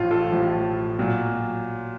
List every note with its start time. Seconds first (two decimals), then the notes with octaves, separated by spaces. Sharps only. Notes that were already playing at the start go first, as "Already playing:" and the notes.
Already playing: A1 A2 F3 F4
0.11 F4 A4
0.32 A1 A2 F3
0.99 A#2 F#3